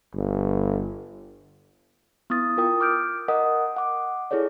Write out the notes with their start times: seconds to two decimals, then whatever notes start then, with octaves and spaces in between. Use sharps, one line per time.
0.15 G1
2.30 B3 E4 D#6 A6
2.57 F4 A#4 G5 D#6
2.80 D6 F6 G6 D7
3.28 A#4 D#5 F#5 D#6
3.76 F#5 D6
4.31 E4 G#4 A4 C#5 D5